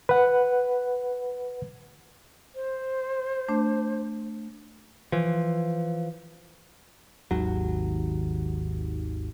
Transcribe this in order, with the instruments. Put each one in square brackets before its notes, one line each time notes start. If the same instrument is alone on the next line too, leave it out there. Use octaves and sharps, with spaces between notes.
[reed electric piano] B4 F#5
[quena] C5
[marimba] A3 D4
[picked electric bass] E3 F3
G#1 D#2 F#3